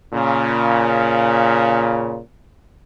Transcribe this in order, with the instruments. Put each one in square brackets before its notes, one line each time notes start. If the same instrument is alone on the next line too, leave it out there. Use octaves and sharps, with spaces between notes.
[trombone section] A#2 C#3